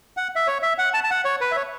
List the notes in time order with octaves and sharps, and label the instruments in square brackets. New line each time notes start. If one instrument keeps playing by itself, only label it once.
[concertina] F#5
E5
C#5
E5
F#5
A5
A5
F#5
C#5
B4
E5
C#5